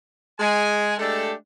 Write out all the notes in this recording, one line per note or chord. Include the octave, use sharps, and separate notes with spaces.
G#3 G#5
G#3 A3 D4 G4 A4